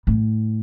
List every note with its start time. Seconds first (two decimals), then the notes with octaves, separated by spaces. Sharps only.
0.07 A2